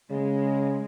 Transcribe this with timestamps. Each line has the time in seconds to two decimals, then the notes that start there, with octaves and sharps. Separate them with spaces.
0.10 C#3 G#3